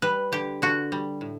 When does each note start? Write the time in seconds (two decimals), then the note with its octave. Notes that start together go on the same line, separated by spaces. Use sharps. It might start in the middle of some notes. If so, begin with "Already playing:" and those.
0.02 G3 B4
0.32 D3 G4
0.62 D3 F#4
0.92 G3
1.21 A2